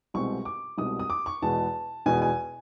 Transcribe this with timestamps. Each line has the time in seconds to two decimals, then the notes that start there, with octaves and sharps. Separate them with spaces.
0.14 C2 B2 G#3 C4 C#6
0.45 D6
0.78 C2 B2 G#3 C4 D#6
0.99 D#6
1.10 D6
1.26 C#6
1.42 E2 B2 G#3 B3 A5
2.06 E2 B2 G#3 B3 G#5
2.22 G#5